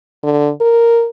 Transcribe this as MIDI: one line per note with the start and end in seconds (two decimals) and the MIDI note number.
0.23 0.50 50
0.61 1.07 70